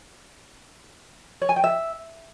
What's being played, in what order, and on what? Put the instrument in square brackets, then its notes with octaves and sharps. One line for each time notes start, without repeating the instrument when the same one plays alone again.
[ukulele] C#5
G#5
G5
E5